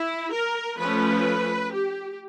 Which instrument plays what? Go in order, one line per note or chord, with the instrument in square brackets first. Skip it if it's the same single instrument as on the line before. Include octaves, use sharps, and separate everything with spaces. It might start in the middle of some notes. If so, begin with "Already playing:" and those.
Already playing: [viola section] E4
A#4
F3 A3 C#4 B4
G4